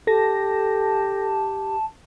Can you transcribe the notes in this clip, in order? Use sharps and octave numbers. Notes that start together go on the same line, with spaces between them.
G4 A4 A5 A#6